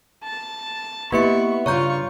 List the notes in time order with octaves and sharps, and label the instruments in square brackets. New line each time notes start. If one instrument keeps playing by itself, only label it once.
[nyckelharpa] A5
[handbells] A#3 G4 C#7 [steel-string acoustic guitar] B3 E4 [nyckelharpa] C#6
[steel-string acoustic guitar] G2 C#3 [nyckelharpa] F4 C#6 [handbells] C#5 A#5 G6